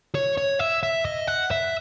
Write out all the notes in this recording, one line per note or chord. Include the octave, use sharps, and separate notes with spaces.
C#5
C#5
E5
E5
D#5
F#5
E5